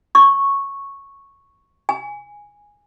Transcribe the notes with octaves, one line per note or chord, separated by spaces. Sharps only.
C#6
G#5